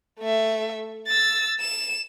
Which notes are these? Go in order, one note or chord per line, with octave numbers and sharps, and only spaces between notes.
A3 E5
E6 A6
E7